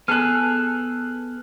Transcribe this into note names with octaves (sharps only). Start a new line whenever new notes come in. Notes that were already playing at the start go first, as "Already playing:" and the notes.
B3 G#4 A4 F6 F#6